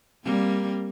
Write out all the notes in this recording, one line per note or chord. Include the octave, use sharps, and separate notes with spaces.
G3 A#3 C4